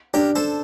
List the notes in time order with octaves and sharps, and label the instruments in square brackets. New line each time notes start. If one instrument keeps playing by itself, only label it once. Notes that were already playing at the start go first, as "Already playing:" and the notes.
[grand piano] D4 [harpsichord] G4 A#4
[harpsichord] A4 C5